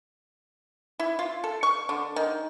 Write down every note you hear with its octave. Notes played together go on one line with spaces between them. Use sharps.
E4
F4
A4
C#6
D3
D#3